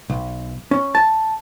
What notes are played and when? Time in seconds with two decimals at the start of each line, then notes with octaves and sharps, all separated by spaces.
0.10 B1
0.71 C#4
0.95 A5